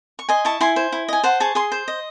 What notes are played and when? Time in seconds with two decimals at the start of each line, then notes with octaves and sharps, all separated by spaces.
0.19 C#6
0.29 D#5 G#5 C6
0.45 E4 A5 C#6
0.61 E4 G#5 C6
0.76 C5
0.92 E4
1.08 D#5 G#5
1.24 C5 F#5 A5
1.40 G#4 A5 C#6
1.55 G#4 C6 D#6
1.72 C5
1.88 D#5